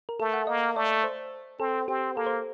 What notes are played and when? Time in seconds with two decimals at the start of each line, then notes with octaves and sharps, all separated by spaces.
0.09 A#4
0.20 A3 A4
0.33 F#5
0.47 A#3 D#5
0.76 A3 D5
1.04 C5
1.60 C4 A4
1.88 C4 G4
2.16 A#3 A4
2.26 C5